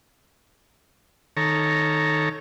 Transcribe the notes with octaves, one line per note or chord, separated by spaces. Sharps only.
D#3 A4 C#5 A#5